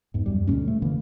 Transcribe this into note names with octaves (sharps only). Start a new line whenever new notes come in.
E2 G#2
F#2 G3
D2 B2 A3 C#4
A3
D3 E3 A#3